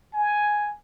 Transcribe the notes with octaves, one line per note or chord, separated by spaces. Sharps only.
G#5